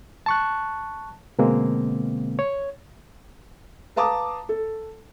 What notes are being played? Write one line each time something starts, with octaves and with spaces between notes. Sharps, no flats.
A5 C#6 F#6
B2 D3 G#3 A#3 C4
C#5
B4 F5 A5 A#5 D6 D#6
A4